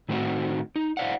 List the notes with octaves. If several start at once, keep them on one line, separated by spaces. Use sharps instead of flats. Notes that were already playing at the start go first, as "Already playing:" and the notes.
A2 D#3 A3 C4 D#4 F#4
D#4
E4 C5 D5 F5 F#5